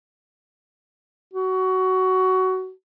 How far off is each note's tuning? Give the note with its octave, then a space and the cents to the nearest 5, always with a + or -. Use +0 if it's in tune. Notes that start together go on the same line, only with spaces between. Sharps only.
F#4 +15